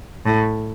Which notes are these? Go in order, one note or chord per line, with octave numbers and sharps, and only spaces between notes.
A2